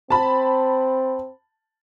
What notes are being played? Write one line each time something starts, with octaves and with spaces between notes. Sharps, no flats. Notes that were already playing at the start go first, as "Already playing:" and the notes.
C4 A5 B5